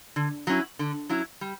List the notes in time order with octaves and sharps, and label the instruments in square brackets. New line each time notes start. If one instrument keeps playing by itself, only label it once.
[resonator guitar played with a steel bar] D3
F#3 C#4 E4
D3
F#3 C#4 E4
G3